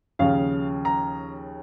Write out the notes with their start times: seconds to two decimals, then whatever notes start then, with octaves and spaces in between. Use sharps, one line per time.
0.19 D#2 C#3 F3 F5
0.85 A#5